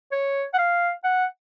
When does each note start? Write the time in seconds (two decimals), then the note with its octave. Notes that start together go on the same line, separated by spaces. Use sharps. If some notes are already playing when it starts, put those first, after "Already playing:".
0.12 C#5
0.54 F#5
0.58 F5
1.04 F#5